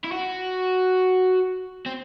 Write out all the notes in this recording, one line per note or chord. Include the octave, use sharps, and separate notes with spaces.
E4
F#4
C4